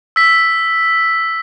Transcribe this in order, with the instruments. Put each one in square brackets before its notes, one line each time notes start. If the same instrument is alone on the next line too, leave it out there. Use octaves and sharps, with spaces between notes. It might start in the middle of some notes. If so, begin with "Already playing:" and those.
[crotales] E6 B6